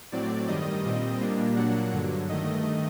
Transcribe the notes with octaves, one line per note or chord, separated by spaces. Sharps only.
A2 F#3 C4 D5
G2 D#3 G3 D#5
A#2 G3 C4 D#5
A#2 G3 A#3 D4
A#2 F#3 A#3 D4 F#5
G2 D3 F#3
G2 D#3 A3 D#5